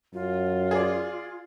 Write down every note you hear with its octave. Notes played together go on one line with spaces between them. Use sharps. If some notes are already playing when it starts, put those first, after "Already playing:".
F#2 F4
G#4 D5